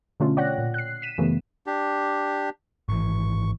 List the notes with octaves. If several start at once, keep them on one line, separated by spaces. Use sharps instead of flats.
B2 D3 A3 C#4 F4
C#5 D5 F#5 G5 F#6 A#6
A#2
F#6 C7
B6 D#7 E7
F#2 C#3 E3 A3 B3
D4 G4
G#1 E3 C#6